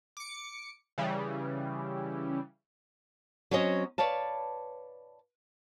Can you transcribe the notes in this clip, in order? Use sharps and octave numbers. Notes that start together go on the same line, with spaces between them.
D6 C#7
C#3 E3 G3
F#3 C4 C#4 C#5 D#5
B4 C#5 D5 F5 A5